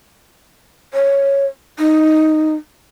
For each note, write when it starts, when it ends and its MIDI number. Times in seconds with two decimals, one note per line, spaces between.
0.94 1.46 73
1.79 2.54 63